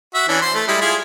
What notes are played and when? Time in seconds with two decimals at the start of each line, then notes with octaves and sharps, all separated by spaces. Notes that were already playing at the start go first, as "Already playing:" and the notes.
0.14 F#4 E5
0.29 E3 C#4 D4
0.42 C5 C6
0.55 A3
0.68 G3 G#3 E4
0.81 E4 F4 G#4